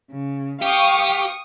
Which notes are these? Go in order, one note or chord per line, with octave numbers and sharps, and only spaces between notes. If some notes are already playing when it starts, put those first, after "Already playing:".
C#3
G4 F5 G5 C#6 D#6